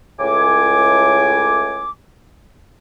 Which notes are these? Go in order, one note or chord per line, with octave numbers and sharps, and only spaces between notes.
C#2 A2 G#5 D6